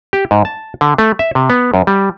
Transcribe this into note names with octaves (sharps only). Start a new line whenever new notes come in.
G4
G#2
A5
D3
A3
E5
C3
B3
F#2
G3